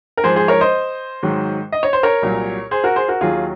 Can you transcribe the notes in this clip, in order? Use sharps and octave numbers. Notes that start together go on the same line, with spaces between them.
A#4
G#2 F3 G#4 C5
G#4 C5
A#4 C#5
C5 D#5
G#2 D#3 F#3
D#5
C#5
C5
A#4 C#5
C2 A#2 F#3
G#4 C5
F#4 A#4
G#4 C5
F#4 A#4
D#2 D#3 F#3 F4 G#4